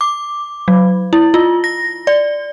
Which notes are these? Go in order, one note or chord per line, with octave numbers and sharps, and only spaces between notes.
D6
F#3
E4
F4
A#6
D5